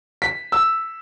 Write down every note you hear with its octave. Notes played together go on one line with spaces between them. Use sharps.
B6
E6